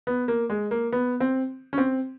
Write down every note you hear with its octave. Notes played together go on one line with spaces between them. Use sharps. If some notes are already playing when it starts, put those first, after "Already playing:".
B3
A#3
G#3
A#3
B3
C4
C#4
C4